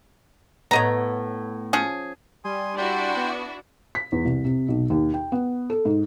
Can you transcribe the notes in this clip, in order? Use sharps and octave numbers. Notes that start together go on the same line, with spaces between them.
A2 B3 C#5 D#5 A#5
F3 C#4 G#4
G3 G#5 C6 D#6
D4 E4 F#4 G5 B5 C6
B3
B6
E2
C2
C3
B1
D#2
G5
B3
A4
G#2